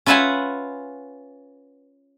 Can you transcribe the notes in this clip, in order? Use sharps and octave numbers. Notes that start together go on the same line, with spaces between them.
C#4 F4 B4 E5 F#5 G#5